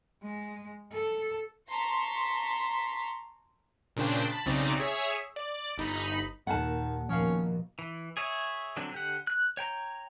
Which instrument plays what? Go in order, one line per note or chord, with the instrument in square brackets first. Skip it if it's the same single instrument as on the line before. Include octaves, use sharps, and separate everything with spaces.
[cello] G#3
A4
[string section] A5 A#5 C6 C#6 B6
[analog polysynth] A#2 C#3 D4 C5 G5
A5 B5 A6
B1 C#3 C4 D#4 D5
G#4 C#5 E5
D5
G1 D#4 B5
[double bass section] D#2 A#2 [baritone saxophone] D#3 [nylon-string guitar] F#5 A5
[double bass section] D#2 B2 A#3 [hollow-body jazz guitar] F3 F5 [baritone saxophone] C#4
[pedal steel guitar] E3
G#4 C#5 E5
D3 F#3 C4 D4
D3 G4 F#5
F#6
C#5 G5 A#5